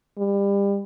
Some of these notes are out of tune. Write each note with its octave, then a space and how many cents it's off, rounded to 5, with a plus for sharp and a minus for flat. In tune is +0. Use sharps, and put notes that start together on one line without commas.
G3 +30